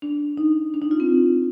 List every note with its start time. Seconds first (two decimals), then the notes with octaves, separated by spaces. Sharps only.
0.02 D4
0.38 D#4
0.74 D4
0.82 D#4
0.91 F4
1.00 C4